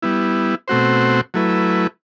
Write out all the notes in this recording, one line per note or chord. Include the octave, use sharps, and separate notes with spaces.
G3 B3 E4
B2 A3 C4 F#4 C5
F#3 A3 E4 B4